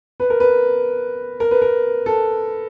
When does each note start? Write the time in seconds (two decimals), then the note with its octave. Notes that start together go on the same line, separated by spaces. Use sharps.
0.20 B4
0.30 A#4
0.40 B4
1.40 A#4
1.51 B4
1.62 A#4
2.06 A4